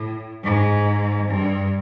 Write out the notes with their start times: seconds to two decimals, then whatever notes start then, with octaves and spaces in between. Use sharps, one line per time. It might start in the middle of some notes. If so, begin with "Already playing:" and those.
Already playing: A2
0.44 G#2
1.28 G2